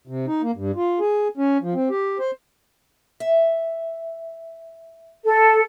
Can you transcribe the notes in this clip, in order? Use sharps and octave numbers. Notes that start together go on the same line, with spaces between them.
C3
D#4
A#3
G2
F4
G#4
C#4
F3
C4
G4
C5
E5
A4